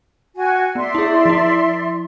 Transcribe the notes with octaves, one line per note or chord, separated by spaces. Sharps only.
F#4 G#5
B3 D5 E5 C6
E4 G#4
F3 E4